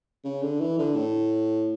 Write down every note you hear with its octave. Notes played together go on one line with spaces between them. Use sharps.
C#3
D3
E3
D3
A2